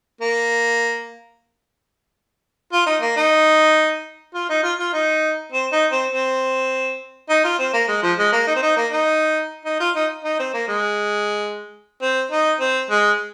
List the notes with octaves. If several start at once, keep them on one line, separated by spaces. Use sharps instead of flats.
A#3
F4
D#4
A#3
D#4
F4
D#4
F4
F4
D#4
C4
D#4
C4
C4
D#4
F4
C4
A#3
G#3
F3
G#3
A#3
D#4
C4
D#4
A#3
D#4
D#4
F4
D#4
D#4
C4
A#3
G#3
C4
D#4
C4
G#3